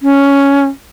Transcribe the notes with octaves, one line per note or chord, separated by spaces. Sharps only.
C#4